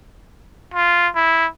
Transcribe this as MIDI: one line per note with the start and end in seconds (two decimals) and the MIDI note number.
0.74 1.08 65
1.16 1.47 64